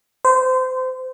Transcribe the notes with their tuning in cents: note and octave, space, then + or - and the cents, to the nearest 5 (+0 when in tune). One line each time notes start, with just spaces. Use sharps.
C5 -25